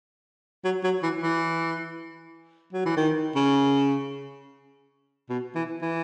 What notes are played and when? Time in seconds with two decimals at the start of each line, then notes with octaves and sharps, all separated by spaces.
0.64 F#3
0.84 F#3
1.03 E3
1.23 E3
2.73 F#3
2.86 E3
2.97 D#3
3.35 C#3
5.30 B2
5.55 E3
5.82 E3